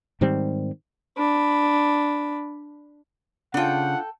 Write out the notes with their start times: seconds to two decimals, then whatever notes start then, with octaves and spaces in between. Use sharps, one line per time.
0.21 G#2 D#3 G3 C4
1.17 D4 B5
3.54 C#3 D4 F4 A4 F#5 G5